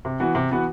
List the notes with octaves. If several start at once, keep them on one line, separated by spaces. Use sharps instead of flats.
C3
E3 B3 F#4
C3
E3 B3 F#4